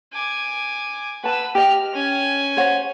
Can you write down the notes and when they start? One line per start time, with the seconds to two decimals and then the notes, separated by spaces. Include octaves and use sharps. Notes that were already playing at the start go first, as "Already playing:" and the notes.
0.13 G#5 D6
1.24 B4 F#5 A5 E6
1.55 G4 D#5 F6
1.93 C#4 G#5
2.57 C5 C#5 F#5